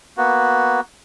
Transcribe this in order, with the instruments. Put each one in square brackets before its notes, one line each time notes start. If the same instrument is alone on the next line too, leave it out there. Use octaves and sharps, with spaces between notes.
[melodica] A#3 B3 F#4